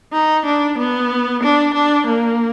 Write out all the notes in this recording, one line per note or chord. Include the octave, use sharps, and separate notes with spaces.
D#4
D4
B3
D4
D4
A#3